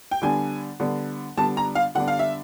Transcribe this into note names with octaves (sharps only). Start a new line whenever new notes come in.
G5
D3 G3 B3 D4 G#5
D3 G3 B3 D4
D3 G3 B3 D4 A5
A#5
F5
D3 G3 B3 D4 F#5
F5
E5